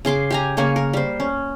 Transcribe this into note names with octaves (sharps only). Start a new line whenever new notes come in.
C#3 G#4 C6 D6
G4 G#5 A#5
C#3 A#3 C#5 G#5
A#4
G3 C5
C#4